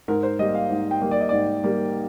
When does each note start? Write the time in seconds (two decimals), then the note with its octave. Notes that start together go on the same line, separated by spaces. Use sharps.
0.08 G#2 A#4
0.23 C5
0.39 G3 A#3 D#5
0.55 F5
0.70 G#2
0.91 G5
1.02 G3 A#3
1.11 D5
1.21 D#5
1.29 G#2 D5
1.64 G3 A#3